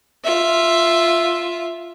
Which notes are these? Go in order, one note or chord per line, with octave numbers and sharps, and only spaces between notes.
F4 E5